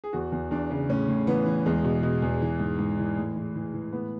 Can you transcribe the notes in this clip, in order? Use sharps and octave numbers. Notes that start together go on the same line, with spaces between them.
G#4
E2 F#4
E2
E2 D4
C#3
A2 C#4
A2
E3 B3
E3
E2 G#3
B2
B2
E2
E3
G#2
G#2
E3
A2
E3
E3
E3
A2 B3